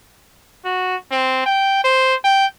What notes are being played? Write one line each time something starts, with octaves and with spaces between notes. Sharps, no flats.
F#4
C4
G5
C5
G5